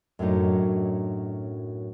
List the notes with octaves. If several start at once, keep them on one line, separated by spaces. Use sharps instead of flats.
F#2 A2 F#3 D4 D#4